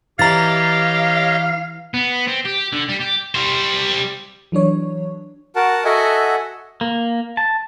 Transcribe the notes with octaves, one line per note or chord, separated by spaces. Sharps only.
E3 G4 C#5 D#5 F5 A#5 A6
B3
C4
G4
D3
G3
G4
G3 C5
E3 F#3 D4 C#5
F#4 A#4 F#5 A5
F#4 A4 D#5 E5 F#5 G#5
A#3
A5